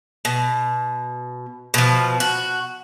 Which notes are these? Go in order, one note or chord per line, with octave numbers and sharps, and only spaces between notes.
B2
B2 F3
F#4